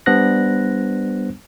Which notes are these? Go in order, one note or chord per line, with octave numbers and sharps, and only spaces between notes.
G3 B3 D4 C5 F#6 A#6